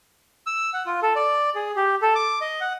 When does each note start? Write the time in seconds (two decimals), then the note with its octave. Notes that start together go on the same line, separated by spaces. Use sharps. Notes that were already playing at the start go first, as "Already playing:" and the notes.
0.47 E6
0.74 F#5
0.86 F4
1.03 A4
1.16 D5
1.55 G#4
1.76 G4
2.02 A4
2.15 D6
2.41 D#5
2.61 F#5